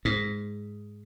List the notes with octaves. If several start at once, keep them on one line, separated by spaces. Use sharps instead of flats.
G#2